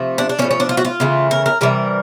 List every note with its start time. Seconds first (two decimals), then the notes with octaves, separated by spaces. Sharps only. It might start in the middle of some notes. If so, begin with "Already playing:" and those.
Already playing: C3 F3 A3
0.18 D4
0.29 D4
0.39 A#3 C#4
0.42 A2 F3
0.51 C#4
0.60 D4
0.69 F4
0.77 F#4
0.85 F4
1.00 C#3 E3 A3
1.31 A#4
1.46 A#4
1.61 C3 E3 G3 A#4